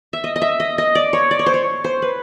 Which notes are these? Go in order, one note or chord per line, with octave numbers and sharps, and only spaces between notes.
E5
D#5
D#5
E5
D#5
D#5
D5
C#5
D5
C#5
C5
C#5
C5
B4